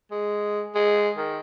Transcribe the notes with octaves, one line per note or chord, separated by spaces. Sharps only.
G#3
G#3
D#3